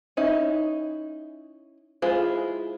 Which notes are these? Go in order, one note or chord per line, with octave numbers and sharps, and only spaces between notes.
C#4 D#4 E4
G#3 E4 F4 G#4 C5